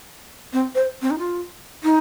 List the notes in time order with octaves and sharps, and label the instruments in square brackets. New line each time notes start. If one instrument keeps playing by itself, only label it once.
[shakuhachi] C4
C5
C4
D#4
F4
D#4